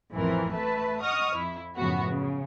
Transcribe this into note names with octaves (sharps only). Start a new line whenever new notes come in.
A1 F2 E3 C4 A#4
A3 B4 E5 A5
D#5 F#5 C#6 D#6 F6
F2 E4
F#2 A2 C#3 F3 B3 F#4
C#3